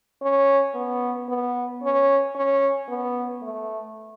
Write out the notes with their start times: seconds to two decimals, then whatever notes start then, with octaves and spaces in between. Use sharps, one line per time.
0.22 C#4
0.75 B3
1.29 B3
1.83 C#4
2.35 C#4
2.89 B3
3.42 A3